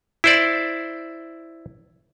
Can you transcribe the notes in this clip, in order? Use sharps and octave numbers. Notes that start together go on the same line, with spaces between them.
E4 C5 D5